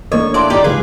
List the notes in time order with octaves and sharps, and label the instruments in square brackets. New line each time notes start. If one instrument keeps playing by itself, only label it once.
[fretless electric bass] A1 A#3 D4 [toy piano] A4 A#4 D#5 [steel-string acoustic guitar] C#5
[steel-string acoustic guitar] D#2 E3 A4 [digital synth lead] D5 [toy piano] C6 D#6
[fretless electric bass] E1 [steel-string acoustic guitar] A2 D#4 G4
[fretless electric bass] C#3 F3 G#3 [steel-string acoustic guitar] F4 B4 [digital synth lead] G#4